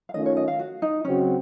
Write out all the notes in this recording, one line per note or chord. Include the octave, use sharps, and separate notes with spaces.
F5
D#3 A3 C#4 F4 D#5
C#5
D#5
F5
F#4
D#4
C#3 F#3 C4 C#4 F#4